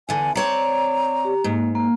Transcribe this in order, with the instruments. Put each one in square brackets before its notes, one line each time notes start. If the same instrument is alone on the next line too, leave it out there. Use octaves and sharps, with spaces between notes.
[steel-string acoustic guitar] E2 D3 [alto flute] G#5
[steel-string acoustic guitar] C4 C#5 D5 [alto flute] A#5
[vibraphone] G4
[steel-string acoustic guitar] G#2 [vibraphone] A#3
[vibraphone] A#3